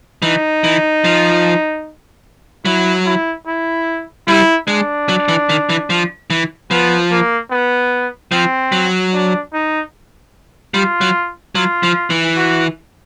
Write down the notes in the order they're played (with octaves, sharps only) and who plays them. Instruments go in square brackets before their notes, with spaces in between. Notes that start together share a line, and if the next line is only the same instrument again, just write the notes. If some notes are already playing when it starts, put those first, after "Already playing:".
[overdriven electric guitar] E3 [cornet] D#4
[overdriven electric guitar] E3
F3
[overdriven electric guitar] F#3 [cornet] E4
[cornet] E4
E4
[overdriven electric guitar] G3 [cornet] E4
[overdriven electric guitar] G#3 [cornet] D4
[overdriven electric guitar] F#3
E3
D#3
E3
F3
E3
[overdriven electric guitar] F3 [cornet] B3
[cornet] A#3
B3
[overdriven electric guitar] F3 [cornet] C4
[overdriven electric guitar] F#3
[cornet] D4
D#4
[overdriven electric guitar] G3 [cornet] F4
[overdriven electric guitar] F#3
[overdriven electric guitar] F#3 [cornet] F4
[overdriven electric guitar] F3
E3
[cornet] F#4